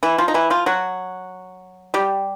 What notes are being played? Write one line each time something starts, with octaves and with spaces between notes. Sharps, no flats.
E3 E4
F3 F4
D#4
E3 E4
F3 F4
F#3 F#4
G3 G4